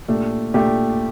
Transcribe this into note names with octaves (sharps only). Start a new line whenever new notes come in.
A#2 A3 D4 G4
A#2 A3 D4 G4